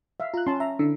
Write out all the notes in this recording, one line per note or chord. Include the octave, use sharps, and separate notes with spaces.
E5 F5
F4 A#5 F#6
C#4 A5 C6
E5 A#5
D3 E4 E6